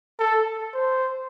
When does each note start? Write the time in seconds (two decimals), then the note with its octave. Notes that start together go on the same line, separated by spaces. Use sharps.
0.19 A4
0.74 C5